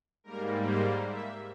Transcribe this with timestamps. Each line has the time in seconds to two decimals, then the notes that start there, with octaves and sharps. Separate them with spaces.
0.24 G#2 G3 A#3 A#4
0.65 C5
1.07 E5